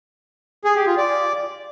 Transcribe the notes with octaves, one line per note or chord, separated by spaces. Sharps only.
G#4
G4
F4
D5